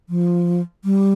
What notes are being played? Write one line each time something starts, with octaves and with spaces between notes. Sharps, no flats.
F3
G3